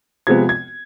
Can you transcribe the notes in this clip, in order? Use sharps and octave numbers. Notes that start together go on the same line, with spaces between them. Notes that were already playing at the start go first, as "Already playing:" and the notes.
C3 F3 G#3 B3 G#6
G#6